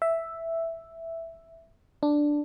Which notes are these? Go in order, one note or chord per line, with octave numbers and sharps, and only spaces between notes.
E5
D4